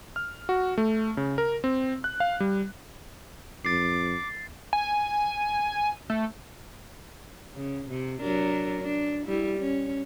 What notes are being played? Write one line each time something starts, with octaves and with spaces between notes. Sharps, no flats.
F6
F#4
A3
C#3
A#4
C4
F#6
F5
G3
F2 D6 A6 C7
G#5
A3
C#3
C3
F#3 D4 A#4
D4
G3 E4
C#4